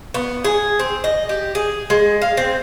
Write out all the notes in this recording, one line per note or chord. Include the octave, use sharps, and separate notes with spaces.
B3
G#4
C4
D#5
G4
G#4
G#3
F5
C4